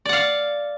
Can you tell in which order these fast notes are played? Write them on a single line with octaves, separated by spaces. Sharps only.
D5 F#5 F5